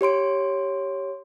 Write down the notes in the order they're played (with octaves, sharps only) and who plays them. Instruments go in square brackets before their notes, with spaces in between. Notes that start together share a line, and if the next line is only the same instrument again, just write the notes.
[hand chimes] G4 C#5 C6 D7